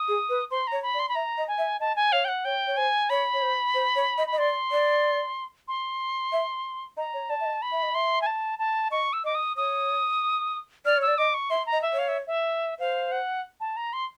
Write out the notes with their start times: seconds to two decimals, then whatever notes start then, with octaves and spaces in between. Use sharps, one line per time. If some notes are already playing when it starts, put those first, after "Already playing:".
Already playing: D#6
0.08 G#4
0.29 B4
0.51 C5 C6
0.67 C#5 A#5
0.83 B5
0.94 D5
0.99 C6
1.09 B5
1.15 E5 A#5
1.38 D#5
1.48 G#5
1.58 E5
1.80 D#5 A5
1.96 G#5
2.12 C#5 F5
2.25 G5
2.28 F#5
2.45 C#5 G5
2.67 C#5
2.77 C5 G#5
3.10 C#5 B5
3.34 C#5
3.42 C5
3.74 C5
3.96 C#5
4.18 D#5
4.27 B5
4.32 D#5
4.38 D5 C6
4.72 D5
5.68 C6
6.32 E5
6.97 D#5 A#5
7.14 C#5
7.29 D5 A5
7.41 E5
7.45 D#5
7.62 B5
7.72 E5
7.83 D#5
7.93 E5 C6
8.22 G#5
8.26 A5
8.59 A5
8.91 D#5 C#6
9.13 E6
9.24 D#5 D6
9.35 D#6
9.57 C#5 D#6
10.85 D5 F6
10.98 C#5 E6
11.07 D5
11.18 D#5 D6
11.34 C#6
11.50 E5 C6
11.66 A#5
11.72 D#5
11.82 E5
11.93 C#5
11.99 F5
12.08 E5
12.27 E5
12.80 C5 F5
13.12 F#5
13.60 A5
13.77 A#5
13.93 C6